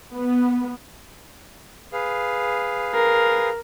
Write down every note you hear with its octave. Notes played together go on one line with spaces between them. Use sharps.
B3
G#4 B4 F5
A#4